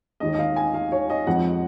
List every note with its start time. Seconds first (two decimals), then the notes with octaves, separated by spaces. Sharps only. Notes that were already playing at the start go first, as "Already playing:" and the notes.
0.20 D#2 D#3 G#3 D#5
0.34 D#5
0.39 F5
0.56 G#5
0.74 F5
0.92 C#5
1.10 D#5
1.27 F2 F3 G#3 F#5